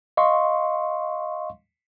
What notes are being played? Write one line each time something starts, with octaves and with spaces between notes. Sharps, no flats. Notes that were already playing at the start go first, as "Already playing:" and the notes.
D#5 F5 C6 C#6